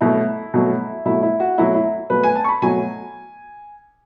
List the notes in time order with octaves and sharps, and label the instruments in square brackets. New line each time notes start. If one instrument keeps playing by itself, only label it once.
[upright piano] B2 F#3 A3 E4
B2 F#3 A3
B2 F#3 A3 E4
E4
F#4
B2 F#3 A3 E4
E4
B2 F#3 A3 B4
G#5
A5
C#6
B5
B2 F#3 A3 G#5